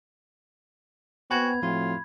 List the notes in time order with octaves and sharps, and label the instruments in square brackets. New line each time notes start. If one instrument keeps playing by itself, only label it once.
[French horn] B3 [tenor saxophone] F#4 [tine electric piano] C5 G5 G#5 [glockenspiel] B5 G#6
[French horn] A2 [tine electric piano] F3 C4 F#4 [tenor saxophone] F4